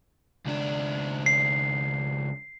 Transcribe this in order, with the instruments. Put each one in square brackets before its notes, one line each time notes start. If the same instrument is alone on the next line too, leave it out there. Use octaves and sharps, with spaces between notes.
[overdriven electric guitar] C#2 D4
[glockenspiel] C7